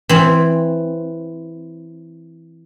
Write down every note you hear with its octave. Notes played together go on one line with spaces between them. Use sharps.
E3 C4